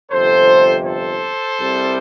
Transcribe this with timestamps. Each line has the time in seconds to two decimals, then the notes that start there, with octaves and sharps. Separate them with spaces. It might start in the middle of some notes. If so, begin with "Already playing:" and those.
0.12 G1 F2 C3 A4 C5
0.85 A4 C5
1.59 C2 C3 G3